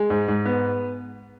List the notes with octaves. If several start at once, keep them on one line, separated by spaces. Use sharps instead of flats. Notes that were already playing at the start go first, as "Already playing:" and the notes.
Already playing: G#3
G#2
G#2
B3